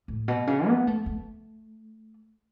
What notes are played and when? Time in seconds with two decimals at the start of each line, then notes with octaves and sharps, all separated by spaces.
0.08 A2
0.28 B2
0.47 C#3
0.68 B3
0.87 A3
1.06 A3